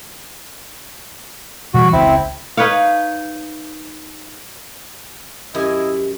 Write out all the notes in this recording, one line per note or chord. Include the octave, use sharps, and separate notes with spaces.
B2 E3 G3 F#4
F1 C#2 C4 E4
D#4 B4 C#5 F5
F#2 E4 G4 D#5 G#5